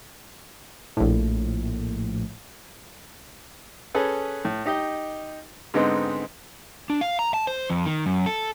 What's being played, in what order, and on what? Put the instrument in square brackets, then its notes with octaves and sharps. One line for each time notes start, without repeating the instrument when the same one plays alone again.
[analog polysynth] A#1 A2
[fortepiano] C#4 G#4 A4 B4
A2
D#4 G4 D#5
G#2 D3 G#3 B3 C4 D#4
[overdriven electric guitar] D4
F5
A#5
A5
C5
F2
D#3
F#2
A4